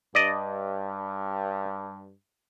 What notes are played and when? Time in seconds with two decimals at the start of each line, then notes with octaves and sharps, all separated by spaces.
0.15 G2 D5 D#5